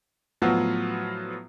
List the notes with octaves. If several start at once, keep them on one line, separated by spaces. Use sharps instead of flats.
A2 F3 F#3 B3 F4 F#4